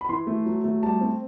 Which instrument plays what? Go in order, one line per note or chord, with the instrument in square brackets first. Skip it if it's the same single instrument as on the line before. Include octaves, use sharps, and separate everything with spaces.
[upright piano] B5
E3 C6
A3
F#3
A3
G3 A5
C4